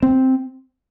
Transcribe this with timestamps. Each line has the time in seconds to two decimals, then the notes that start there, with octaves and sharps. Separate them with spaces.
0.03 C4